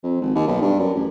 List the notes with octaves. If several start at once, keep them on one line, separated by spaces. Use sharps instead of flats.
F2
G#1
D#2
B1
G2
F#2
A1